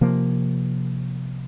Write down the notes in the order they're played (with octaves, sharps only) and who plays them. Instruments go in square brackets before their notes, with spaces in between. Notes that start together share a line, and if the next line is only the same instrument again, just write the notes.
[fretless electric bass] C3 F3 A#3